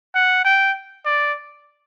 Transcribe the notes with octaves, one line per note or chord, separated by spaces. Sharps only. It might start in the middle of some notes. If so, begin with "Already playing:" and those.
F#5
G5
D5